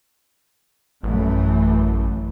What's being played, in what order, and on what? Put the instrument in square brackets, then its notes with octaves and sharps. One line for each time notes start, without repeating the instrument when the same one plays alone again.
[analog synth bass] A1 [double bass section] F#2 E3 A3